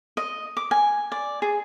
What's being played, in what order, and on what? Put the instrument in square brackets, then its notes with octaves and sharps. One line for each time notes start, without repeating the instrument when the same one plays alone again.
[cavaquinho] D#5
D6
G#5
D5
G#4